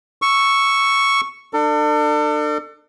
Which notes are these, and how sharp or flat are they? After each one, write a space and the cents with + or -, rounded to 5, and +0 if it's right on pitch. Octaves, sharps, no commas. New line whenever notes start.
C#6 +0 E6 +0
D4 +35 A4 +35